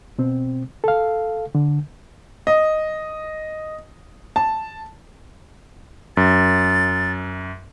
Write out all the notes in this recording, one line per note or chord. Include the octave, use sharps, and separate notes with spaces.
B2 C4
A4 F5
D3
D#5
A5
F#2 A6